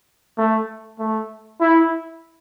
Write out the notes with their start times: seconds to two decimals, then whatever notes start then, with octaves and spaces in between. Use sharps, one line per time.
0.38 A3
0.99 A3
1.61 E4